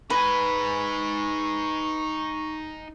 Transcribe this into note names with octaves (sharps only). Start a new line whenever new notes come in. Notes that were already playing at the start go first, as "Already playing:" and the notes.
D#4 B4 G#5 C#6